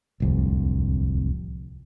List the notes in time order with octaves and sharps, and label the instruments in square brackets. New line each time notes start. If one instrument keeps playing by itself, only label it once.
[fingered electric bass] D1 C2 F2